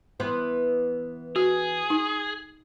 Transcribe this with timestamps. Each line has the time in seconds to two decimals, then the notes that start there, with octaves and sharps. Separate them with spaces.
0.20 E3 B3 C5
1.36 F#4 G#4
1.90 D#4